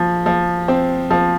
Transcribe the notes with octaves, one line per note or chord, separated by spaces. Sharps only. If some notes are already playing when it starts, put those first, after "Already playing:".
Already playing: F3
F3
C4
F3